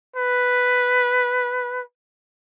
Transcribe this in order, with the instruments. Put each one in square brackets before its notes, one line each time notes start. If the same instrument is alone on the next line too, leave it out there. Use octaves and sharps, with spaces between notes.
[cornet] B4